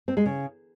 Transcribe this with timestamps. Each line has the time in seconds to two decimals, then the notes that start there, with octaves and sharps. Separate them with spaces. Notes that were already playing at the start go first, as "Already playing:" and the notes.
0.08 C4
0.17 G#3
0.26 C#3